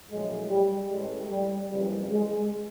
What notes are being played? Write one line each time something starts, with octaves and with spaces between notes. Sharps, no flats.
A#1 A2 F#3 G#3
G3
A1 A2 E3 G#3
G3
F#1 F2 C#3 E3 G3
G#3